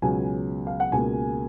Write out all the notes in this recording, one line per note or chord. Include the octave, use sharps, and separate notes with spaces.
C#2 B2 F#3 B3 G#5
F5
F#5
C#2 B2 A#3 G#5